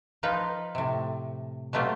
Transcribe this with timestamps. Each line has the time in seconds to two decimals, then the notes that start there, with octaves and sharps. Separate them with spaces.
0.23 F3 D#4 F4 B4
0.75 A2 C3
1.73 B2 F#3 A3 F4 G4